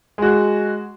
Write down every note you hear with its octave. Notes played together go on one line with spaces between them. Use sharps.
G#3 F#4